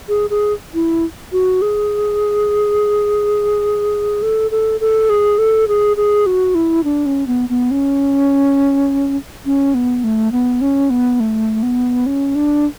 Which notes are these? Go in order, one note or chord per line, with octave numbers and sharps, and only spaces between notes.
G#4
G#4
E4
F#4
G#4
A4
A4
A4
G#4
A4
G#4
G#4
F#4
E4
D4
C#4
B3
B3
C#4
C#4
B3
A3
B3
C#4
B3
A3
B3
C#4
D4